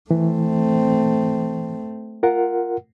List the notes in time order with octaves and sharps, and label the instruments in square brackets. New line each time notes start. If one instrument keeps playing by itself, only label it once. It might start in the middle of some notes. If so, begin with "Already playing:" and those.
[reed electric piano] E3 [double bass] A3 C4
[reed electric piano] F4 A#4 F#5